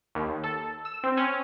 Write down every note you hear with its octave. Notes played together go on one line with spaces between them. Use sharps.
D#2
A4
E6
C4
C#4